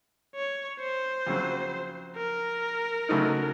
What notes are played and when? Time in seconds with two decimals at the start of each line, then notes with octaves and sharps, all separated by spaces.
0.35 C#5
0.80 C5
1.27 F2 C#3 F#3
2.17 A#4
3.09 C#2 C#3 F#3 A3 D#4